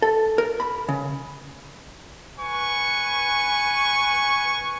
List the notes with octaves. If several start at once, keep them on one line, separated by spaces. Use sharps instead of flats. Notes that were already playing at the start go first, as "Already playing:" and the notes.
A4
A#4
B5
C#3
B4 G#5 C#6